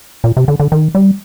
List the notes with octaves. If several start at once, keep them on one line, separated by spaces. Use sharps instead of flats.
A#2
C3
D3
D3
D#3
G3